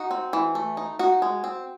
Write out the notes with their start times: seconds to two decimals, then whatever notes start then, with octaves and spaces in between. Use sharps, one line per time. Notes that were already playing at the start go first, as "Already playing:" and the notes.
Already playing: D#4 F#4
0.11 C4
0.33 E3
0.55 A3
0.77 D#4
0.99 D#4 F#4
1.22 G#3
1.44 C4